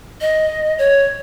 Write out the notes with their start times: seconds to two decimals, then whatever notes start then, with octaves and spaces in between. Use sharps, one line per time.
0.21 D#5
0.78 C#5